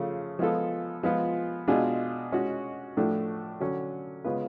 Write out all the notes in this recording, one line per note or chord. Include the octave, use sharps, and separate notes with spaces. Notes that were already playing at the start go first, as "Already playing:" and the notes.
Already playing: C#3 F3 A3 F4
F3 G#3 B3 F4 A4
F3 G#3 B3 F4
B2 G#3 D4 F4 G#4
G#3 C#4 F#4
A2 F3 A3 D4 F#4
D3 F#3 C#4
C#3 G#3 B3 F4 B4